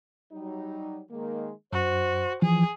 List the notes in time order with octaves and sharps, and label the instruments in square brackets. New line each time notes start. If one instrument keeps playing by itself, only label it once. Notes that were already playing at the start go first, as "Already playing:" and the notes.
[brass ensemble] F#3 G3 D#4
D#3 G#3 A#3
[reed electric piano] F#2 [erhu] F#4 [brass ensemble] C5
[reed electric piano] E3 F3 [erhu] G#4